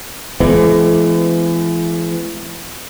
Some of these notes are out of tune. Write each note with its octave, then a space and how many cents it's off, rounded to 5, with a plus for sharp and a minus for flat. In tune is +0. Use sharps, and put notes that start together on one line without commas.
E3 +35 G#3 +40 B3 +40